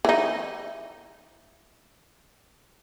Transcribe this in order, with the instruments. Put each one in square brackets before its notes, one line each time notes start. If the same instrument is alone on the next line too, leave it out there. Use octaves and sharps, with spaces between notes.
[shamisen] E3 D#4